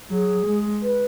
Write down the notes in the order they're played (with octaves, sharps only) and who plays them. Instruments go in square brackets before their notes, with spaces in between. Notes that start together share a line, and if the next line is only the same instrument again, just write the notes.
[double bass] F#3 [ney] G#4
[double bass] G#3
[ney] B4